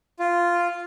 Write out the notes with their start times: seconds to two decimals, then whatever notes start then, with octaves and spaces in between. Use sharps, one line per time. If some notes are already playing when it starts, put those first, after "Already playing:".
0.20 F4